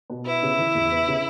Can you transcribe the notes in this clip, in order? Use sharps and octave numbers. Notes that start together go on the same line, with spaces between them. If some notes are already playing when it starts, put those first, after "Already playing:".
B2
B3 E4
C#3
E3
E2
B3
C#3